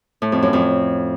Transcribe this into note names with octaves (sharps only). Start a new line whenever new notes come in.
A2
F2
F#2
F2